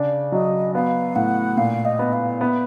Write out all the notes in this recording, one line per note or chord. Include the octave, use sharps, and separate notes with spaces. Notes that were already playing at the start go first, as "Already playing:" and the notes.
Already playing: C#3 D4
F#3 D#5
B3 F5
A2 F#5
A#2 F5
D#5
B3
F5
B3 E5